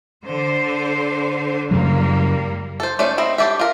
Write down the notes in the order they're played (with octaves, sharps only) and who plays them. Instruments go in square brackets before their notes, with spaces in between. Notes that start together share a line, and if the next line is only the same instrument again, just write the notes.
[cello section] D3 C5
[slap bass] F#2 C#3 F#3 [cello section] G3 A#3
[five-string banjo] A4 C5
A3 C#4 C5 D5
C4 E4 D#5
D4 G4 A4 E5
F4 A#4